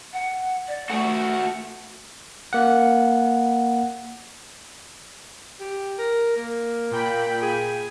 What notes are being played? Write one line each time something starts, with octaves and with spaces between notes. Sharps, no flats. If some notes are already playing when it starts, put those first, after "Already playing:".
F#5
D5
A3 F#4 A4
A#3 F#5
G4
A#4
A#3
A#2 G5 B5
G#4